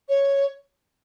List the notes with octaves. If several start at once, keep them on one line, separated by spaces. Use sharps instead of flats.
C#5